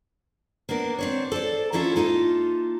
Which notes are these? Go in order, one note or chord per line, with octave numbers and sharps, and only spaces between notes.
A#3 B3 D4 A#4
C4 D4 C#5
A4 C5 D5
A#3 C#4 D4 E4 F4 A4
A#3 D#4 F4 A4 E5